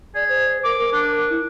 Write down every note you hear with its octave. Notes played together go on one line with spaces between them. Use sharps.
G#4 D5
C5
A#4 D6
A#4
D4
E4